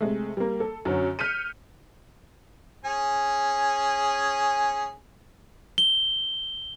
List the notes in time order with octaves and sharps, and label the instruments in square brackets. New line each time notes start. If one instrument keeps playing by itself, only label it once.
[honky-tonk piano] C3 G#3 A3
G3 A#3
A4
F#2 D3 F#3 C#4
F6 G6 B6 C#7 D#7
[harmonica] C#4 G#4 G#5
[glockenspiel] G7